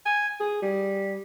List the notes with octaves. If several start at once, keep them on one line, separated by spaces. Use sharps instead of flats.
G#5
G#4
G3